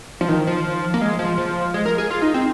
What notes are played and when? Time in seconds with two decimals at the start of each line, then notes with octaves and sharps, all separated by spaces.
0.21 F3
0.29 D#3
0.47 F3
0.94 A#3
1.01 G#3
1.19 F3
1.38 F3
1.74 G#3
1.86 A#4
1.98 G#4
2.11 F4
2.22 D#4
2.34 C4